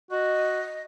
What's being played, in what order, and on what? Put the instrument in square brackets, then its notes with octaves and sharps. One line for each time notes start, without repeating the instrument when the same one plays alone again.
[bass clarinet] F#4 [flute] D#5